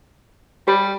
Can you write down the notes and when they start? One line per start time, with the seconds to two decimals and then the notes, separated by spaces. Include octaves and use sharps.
0.68 G3 G4